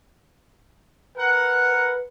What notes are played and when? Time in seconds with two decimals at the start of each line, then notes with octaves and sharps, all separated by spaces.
1.16 A#4 B4 F#5
1.73 B4